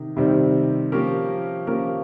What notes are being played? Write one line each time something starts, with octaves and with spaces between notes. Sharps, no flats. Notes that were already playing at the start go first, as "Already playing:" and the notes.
Already playing: C3 D#3
C3 D#3 G3 C4
F3 A#3 C#4 G4 A#4
F3 A#3 C#4 G4 A#4